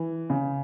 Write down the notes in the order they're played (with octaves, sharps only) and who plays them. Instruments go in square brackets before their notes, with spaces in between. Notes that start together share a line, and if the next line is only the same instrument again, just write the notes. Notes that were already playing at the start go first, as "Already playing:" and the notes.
Already playing: [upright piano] E3
C#3